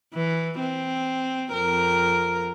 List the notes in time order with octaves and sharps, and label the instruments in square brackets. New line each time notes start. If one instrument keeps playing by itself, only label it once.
[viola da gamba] E3
C4
F2 A#4